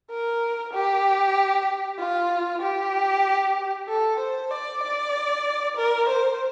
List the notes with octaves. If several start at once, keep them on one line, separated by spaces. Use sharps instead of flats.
A#4
G4
F4
G4
A4
C5
D5
D5
A#4
C5